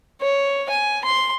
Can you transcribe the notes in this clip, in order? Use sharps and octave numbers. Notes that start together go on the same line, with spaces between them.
C#5
G#5
C6